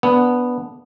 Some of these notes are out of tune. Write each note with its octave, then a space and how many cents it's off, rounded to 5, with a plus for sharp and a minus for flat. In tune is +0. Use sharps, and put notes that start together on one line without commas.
B3 +0 D4 -5